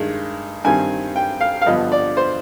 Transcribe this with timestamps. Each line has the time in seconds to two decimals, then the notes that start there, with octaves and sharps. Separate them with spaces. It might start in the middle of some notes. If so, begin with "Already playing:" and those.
Already playing: G2 D#3 G#3
0.64 G2 D#3 G3 C4 G#5
1.16 G5
1.41 F5
1.62 F5
1.66 G2 D3 F3 B3 D#5
1.92 D5
2.17 C5